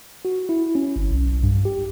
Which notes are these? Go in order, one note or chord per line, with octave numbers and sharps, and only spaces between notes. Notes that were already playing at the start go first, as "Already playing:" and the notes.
F#4
E4
C#4
G1
B1
G2
G4